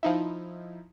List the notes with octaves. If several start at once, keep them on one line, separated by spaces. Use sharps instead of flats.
F3 D#4 E4